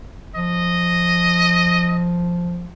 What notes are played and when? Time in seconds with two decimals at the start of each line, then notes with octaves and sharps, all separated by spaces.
0.35 F3 D#5